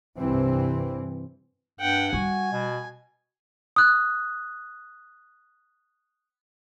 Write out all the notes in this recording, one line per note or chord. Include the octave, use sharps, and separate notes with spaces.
C2 G2 E3 C4
G2 F#5 G5
G3 F#4 G#5
B2
D#6 F#6